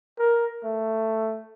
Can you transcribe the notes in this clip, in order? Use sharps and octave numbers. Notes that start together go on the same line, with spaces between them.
A#4
A3